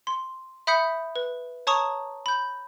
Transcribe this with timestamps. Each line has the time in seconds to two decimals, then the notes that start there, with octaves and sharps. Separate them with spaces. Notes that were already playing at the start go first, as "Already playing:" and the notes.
0.07 C6
0.67 E5 B5 D#6 G6 B6 C#7
1.16 B4
1.67 C#5 A5 A#5 C#6 D#6
2.26 B5 G6